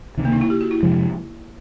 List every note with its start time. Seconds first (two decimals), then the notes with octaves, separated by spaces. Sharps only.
0.17 C#2 C3 D#3
0.25 A#3
0.33 D#4
0.41 E4
0.50 G4
0.61 F#4
0.71 E4
0.83 F2 C3 F3 G#3